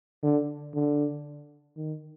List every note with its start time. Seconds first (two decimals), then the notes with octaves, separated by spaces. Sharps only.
0.23 D3
0.74 D3
1.77 D#3